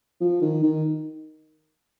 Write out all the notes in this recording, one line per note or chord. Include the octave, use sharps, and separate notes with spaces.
F3
D#3
D#3